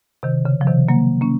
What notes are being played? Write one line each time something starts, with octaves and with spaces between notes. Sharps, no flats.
C3 D#3
C#3
F3
C3 D#3
F#3 A#3
A#3 C#4